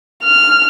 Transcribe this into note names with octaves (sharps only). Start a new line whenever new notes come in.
F6